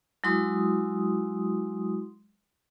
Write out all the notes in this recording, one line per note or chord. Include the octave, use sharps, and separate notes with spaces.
F#3 G#3 E4 F#4 C6 D#6